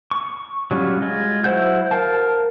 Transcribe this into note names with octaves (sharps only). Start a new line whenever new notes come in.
C#6
F#3 G3 C#4 F4
G#3 F4
F#3 E4 C5 F#5 G6
A#4 F5 A5